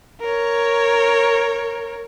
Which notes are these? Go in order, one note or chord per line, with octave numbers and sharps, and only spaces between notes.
A#4 C#5